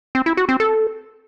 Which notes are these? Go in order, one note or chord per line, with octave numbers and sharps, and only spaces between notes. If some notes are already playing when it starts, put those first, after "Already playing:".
C4
E4
F#4
C4
A4